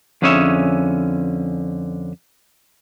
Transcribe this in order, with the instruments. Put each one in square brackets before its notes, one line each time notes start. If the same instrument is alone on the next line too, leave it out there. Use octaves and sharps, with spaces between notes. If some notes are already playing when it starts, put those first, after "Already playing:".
[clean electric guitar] F2 D3 C#4 G#4 C#5 E5